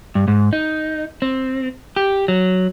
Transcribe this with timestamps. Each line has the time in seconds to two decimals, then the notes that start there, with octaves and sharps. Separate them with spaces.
0.15 G2
0.28 G#2
0.53 D#4
1.22 C4
1.96 G4
2.28 F#3